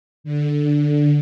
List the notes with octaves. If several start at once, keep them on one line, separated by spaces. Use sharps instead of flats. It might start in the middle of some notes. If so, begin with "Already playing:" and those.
D3